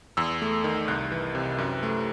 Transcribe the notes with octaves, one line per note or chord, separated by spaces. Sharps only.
E2 E6
A3
D#3
C2 F#6
E3
C3
F#2
A3